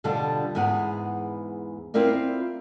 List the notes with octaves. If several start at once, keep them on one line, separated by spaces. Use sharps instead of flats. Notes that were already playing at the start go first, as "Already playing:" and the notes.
B2 D3 G3 D4 F4 A4
E2 G#2 B3 G#4 F#5
C4 E4 F4 A#4 D5